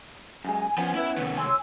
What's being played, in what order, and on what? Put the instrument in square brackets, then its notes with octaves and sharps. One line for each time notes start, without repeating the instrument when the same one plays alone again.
[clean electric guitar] F#2 G#3 [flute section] G#5
[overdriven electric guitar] F3 [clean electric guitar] B3 C#4
[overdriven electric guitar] E4 E5 [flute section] B4
[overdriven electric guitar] C2 D#3
[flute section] C#5 C6 E6 [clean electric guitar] G#5